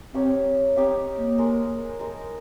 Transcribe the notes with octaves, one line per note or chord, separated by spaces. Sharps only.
C4 D#4 G4 C#5 F5
C4 D#4 G4 C#5 F5
A#3
G#3 D#4 A#4
G#3 D#4 A#4